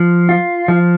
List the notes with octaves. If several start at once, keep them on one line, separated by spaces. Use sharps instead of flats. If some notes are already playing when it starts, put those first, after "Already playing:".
Already playing: F3
F4
F3